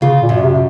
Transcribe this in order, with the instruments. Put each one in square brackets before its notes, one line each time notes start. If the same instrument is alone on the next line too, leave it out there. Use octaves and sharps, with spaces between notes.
[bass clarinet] C#3 [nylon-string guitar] F4
[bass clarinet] A#2
[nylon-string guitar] F#2
[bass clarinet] C3